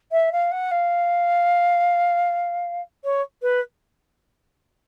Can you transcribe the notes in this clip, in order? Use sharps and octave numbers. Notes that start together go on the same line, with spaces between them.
E5
F5
F#5
F5
C#5
B4